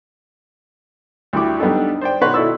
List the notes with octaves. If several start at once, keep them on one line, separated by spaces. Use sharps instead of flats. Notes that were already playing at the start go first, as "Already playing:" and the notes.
D2 G3 E4 D6
G3 B3 D4 D#4 A4
C5 D5 G5
B2 D#3 F#4 B4 C#5 C6
B2 E4 A4 D5 E6